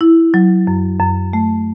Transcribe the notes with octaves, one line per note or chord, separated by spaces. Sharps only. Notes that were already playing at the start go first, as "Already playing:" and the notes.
E4
F#3
F#2
F#2
A3